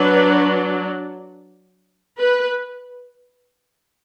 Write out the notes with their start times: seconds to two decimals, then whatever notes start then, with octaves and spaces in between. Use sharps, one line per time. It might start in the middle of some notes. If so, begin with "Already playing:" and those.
Already playing: F#3 D4 B4
2.19 B4